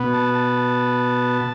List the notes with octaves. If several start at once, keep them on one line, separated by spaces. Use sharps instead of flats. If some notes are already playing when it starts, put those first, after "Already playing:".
Already playing: B2 B3
A5
A5